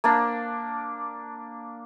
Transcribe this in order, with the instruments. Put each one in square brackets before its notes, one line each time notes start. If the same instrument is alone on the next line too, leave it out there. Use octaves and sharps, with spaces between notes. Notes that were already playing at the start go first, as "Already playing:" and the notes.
[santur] A#3 D4